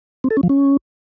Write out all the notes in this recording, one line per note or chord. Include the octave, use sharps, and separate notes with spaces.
C4
A4
C#4
F3
C#4